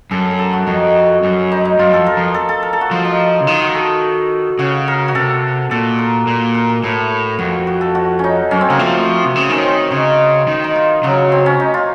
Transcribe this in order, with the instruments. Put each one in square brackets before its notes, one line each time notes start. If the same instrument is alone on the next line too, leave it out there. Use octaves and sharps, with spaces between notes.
[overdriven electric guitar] F#2 [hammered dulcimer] A4
[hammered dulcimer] A#4
A4
F#4
[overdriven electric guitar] F2 [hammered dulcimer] D#4
[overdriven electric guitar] F#2
[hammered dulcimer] D#4
D#4
[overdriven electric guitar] F#2 [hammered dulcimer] F4
[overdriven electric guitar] F2 [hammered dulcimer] A4
[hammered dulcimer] A#4
[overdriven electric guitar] F2
[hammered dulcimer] A4
A4
A#4
A4
F#4
[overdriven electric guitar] F3 [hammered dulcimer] F4
[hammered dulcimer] D#4
[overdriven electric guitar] C#3
[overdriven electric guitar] D#3 [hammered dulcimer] F4
[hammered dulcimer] F#4
A4
[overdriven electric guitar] C#3 [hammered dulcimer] F#4
[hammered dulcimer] A#4
F#4
[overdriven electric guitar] C3 [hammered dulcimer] A4
[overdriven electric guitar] A#2 [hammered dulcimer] A4
[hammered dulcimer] A#4
[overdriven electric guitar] A#2
[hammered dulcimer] A#4
A#4
[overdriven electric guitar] A2 [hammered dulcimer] A4
[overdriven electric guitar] F2 [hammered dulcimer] F#4
[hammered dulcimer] F#4
A4
F#4
C#4 D#4
[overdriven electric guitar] F#2 [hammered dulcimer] C#4
[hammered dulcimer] C4
[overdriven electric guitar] C#3 [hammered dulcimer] A#3
[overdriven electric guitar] F3 [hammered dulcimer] A3
[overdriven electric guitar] C3
C#3
[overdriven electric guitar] D#3 [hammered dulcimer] C#4
[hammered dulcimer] C4
[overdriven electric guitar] C#3 [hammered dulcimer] D#4
[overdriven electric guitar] D#3
[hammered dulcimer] D#4
F4
[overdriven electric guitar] C#3 [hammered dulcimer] F#3
[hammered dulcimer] C4
C#4
D#4
F4